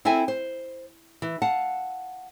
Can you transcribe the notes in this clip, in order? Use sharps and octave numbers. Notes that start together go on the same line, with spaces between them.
C4 E4 A4 E5 G#5
C5
E3
F5 F#5 A5